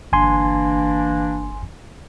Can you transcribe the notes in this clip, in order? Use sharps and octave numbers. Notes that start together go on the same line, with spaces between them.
G1 E3 A#3 D4 G#5 C6